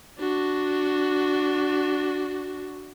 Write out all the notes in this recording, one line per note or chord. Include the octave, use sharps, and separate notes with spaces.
D4 F#4